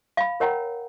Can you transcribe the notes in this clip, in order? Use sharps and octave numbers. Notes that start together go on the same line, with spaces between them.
F5 B5
A#4 C#5 F#5 G5 A#5